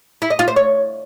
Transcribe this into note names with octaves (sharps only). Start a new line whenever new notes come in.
E4
D#5
F4
C5
C#5